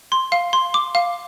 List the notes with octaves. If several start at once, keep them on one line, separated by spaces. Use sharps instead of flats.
C6
F5
C6
D6
F5